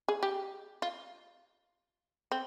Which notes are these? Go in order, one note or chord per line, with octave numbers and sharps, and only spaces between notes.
G#4
G4
F4
C4